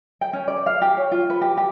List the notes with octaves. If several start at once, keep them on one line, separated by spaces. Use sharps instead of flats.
G5
C#4
D5
F5
G4
C#5
F4
B4
G4
G4